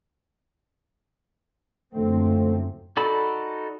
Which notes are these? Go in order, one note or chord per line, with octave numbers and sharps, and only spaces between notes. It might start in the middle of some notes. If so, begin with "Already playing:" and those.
F#1 F#2 D3 F3 A3 C4
D#4 F#4 A4 D5 B5